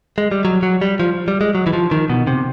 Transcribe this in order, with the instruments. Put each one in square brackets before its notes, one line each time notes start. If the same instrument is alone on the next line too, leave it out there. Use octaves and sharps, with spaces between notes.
[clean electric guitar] G#3
G3
F#3
F#3
G3
F3
G3
G#3
F#3
E3
F3
D#3
B2
C3